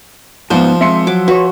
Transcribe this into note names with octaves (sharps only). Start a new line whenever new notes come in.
C2 G#2 F3 B3 C5
G#3 C4 E5 C6 C#7
F#3 D6
F#4 B4 C#5